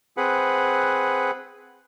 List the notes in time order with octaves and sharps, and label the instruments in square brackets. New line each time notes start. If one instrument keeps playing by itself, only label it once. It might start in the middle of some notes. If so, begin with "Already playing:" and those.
[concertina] C4 G#4 B4 F#5